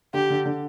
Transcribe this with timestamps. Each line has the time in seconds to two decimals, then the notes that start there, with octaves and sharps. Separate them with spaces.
0.14 D3 G4
0.30 D3
0.45 D3